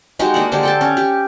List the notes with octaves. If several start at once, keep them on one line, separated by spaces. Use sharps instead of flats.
G#3 D#4 F#4 G4
A#3 D4 F#5
D3 G#3 G4 C5
A4 G5 A5
C#4
G4